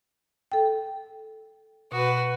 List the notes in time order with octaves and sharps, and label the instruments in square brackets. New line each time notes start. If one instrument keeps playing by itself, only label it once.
[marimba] A4 G5
[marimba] B2 [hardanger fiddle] F#4 B4